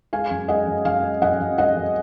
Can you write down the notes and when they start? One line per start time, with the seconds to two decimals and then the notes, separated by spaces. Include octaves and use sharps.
0.13 G#3 F5 G#5
0.31 F#2
0.48 G#3 D#5 F#5
0.67 F#2
0.85 F#2 F5 G#5
1.03 G#3
1.22 F#2 D#5 F#5
1.40 F#2
1.58 G#3 D#5 F#5
1.76 F#2